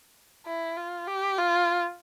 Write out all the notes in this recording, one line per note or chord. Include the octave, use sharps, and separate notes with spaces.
E4
F4
G4
F4